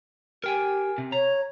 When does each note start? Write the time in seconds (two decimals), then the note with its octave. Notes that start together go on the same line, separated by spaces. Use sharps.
0.44 G4 A#4 G5 G#5
0.98 C3
1.12 C#5 A#5